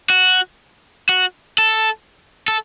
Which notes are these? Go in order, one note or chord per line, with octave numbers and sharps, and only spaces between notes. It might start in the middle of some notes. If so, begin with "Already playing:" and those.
F#4
F#4
A4
A4